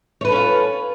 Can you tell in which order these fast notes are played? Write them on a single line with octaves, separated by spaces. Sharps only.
C#5 B4 A4 C#4 F4